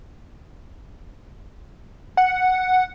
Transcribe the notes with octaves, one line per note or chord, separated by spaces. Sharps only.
F#5